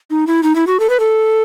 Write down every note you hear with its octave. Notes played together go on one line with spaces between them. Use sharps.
D#4
E4
D#4
E4
F#4
A4
B4
A4